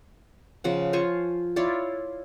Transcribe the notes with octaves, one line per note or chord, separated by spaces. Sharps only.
C#3 F3 F#5
F4 C5 G#5 C#6
E4 F4 C#5 D5